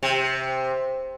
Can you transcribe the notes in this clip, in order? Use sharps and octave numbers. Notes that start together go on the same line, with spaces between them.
C3